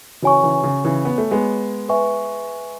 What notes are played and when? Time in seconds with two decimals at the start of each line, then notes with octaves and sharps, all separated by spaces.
0.22 C#3 E3 F#4 C#5 G#5 C#6
0.43 C#3 E3
0.63 C#3
0.84 C#3 E3
1.05 B3
1.18 A3
1.31 G#3 B3
1.89 B4 E5 G#5 C#6